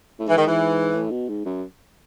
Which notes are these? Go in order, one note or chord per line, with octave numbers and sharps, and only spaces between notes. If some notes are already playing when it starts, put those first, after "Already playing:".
A2
G#2 E3
D#3
E3
A2
B2
G#2
F#2